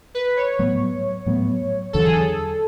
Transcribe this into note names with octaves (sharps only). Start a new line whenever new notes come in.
B4
C#5
A2 F#3 B3
A2 F#3 B3
E2 D3 F#3 A4
G#4
A4